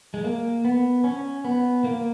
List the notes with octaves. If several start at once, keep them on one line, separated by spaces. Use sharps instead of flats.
G#3
A#3
B3
C#4
B3
A#3